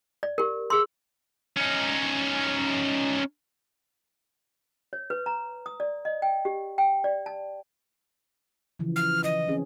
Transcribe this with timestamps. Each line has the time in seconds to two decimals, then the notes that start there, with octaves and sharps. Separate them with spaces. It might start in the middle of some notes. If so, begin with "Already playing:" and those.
0.23 D5
0.38 G4 A#4
0.70 G#4 C6 E6
1.57 C#4 D#4
4.93 C#5
5.10 B4
5.26 A#5
5.66 D#6
5.80 D5
6.05 D#5
6.22 G5
6.45 G4
6.78 G5
7.04 D5
7.26 A5
8.79 C#3 E3 F3
8.96 F6
9.24 D#3 D#5
9.48 C4 C#4 G#4